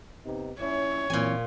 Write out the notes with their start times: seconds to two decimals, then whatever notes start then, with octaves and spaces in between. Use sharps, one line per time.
0.25 C3 B3 D#4
0.60 A#1 C#4 E4 C#5 D5
1.10 F#2 A#2 E3 C4 E4 G#5